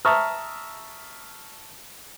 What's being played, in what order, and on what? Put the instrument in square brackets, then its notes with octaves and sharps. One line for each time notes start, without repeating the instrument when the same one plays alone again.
[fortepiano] E5 A5 A#5 C#6 D#6 F6